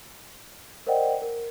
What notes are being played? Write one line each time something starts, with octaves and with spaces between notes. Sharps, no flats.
A#4 C5 D5 D#5 F#5 G5
A#4